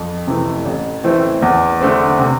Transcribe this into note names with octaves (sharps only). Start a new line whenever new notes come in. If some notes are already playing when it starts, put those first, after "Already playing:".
Already playing: F2
C3 E3 A3
A1
A2 E3 A3 C4
E2
D3 A3 C4
C3